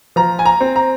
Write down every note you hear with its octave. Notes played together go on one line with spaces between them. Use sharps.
F3 A#5
G#5
A#5
C4
A#5